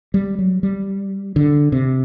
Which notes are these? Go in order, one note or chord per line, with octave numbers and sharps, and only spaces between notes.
G3
F#3
G3
D3
C3